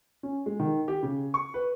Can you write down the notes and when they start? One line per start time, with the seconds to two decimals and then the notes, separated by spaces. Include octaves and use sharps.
0.23 C#4
0.46 G#3
0.60 D#3
0.88 G4
1.03 C#3
1.34 C#6
1.54 B4